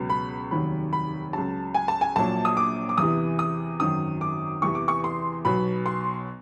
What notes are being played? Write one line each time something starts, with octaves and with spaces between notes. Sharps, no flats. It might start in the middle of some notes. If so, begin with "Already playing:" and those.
Already playing: C#2 B2 F#3
B5
F1 D#2 D#3 F#3 B5
B5
C#2 C#3 F#3 A5
G#5
A5
G#5
A#1 A#2 F#3 A5
D#6
D6
D6
E2 C3 E3 D#6
D#6
G#1 F#2 D#3 F#3 D#6
D6
E2 C3 E3 C#6
D6
C#6
C6
B1 B2 F#3 B5
C6